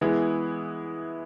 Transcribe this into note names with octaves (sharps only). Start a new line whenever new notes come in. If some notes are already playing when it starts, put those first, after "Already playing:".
E3 G#3 B3 E4 G#4